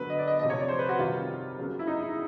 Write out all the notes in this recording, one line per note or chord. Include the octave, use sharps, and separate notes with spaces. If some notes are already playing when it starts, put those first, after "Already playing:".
Already playing: D3 F#3 B3 B4
D#5
D5
D#5
C3 F3 A3 D#5
C#5
D5
C5
B4
F#4
C3 D#3 G3 F4
C#3 F#3 B3
E4
D#4
E4